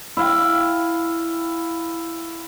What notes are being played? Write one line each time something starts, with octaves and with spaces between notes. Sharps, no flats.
E4 F5 G5